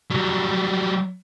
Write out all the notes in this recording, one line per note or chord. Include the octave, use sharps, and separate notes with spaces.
F#3 G3